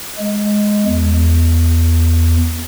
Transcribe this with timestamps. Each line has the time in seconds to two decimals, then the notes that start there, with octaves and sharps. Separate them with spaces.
0.19 G#3
0.86 E2